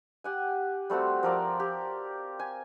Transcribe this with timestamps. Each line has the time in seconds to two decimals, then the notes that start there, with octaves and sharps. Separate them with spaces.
0.24 G4 F#5 G#5
0.90 G3 A3 C4 F#4
1.23 F3 A#4 D5
1.60 G4
2.39 G#5